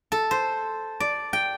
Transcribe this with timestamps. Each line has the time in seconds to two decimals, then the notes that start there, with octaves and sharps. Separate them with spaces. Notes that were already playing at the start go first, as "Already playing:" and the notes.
0.12 A4
0.31 C5
1.00 D5
1.33 G5